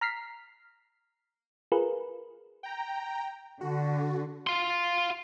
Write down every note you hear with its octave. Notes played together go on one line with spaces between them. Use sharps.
A#5 F6 B6 C7
F4 G#4 A#4 B4
G5 A#5
D3 F#4
F5 C6